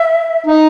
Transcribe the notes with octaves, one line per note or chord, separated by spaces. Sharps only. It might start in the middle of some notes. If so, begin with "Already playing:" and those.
Already playing: E5
D#4